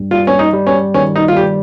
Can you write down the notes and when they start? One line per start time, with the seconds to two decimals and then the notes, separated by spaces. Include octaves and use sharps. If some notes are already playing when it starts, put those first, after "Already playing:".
Already playing: G2 G3
0.11 G3 F4
0.27 C#4
0.39 D#4
0.53 G3
0.67 C#4
0.94 D#3 C#4
1.16 D#4
1.28 F4
1.36 G3 G4